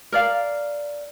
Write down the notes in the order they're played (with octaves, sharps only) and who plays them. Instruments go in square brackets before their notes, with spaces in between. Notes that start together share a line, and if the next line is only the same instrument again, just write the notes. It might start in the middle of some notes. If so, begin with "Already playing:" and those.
[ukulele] A#4 D5 F5